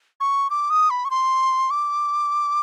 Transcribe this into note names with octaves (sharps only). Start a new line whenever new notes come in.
C#6
D6
D#6
B5
C#6
C6
D6